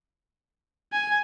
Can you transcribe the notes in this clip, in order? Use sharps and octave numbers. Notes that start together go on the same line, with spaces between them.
G#5